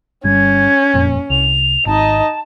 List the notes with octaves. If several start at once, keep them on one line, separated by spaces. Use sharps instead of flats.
G1 G3 C#4 G#6
F#1 F2 A#2
C2 F7
G#1 D#4 D#5 A5